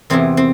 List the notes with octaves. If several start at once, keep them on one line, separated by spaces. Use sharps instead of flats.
E2 C3 E3 C4
C4